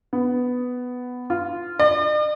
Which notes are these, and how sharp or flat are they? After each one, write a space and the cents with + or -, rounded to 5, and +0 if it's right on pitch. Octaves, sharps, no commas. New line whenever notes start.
B3 +5
F4 -10
D5 +45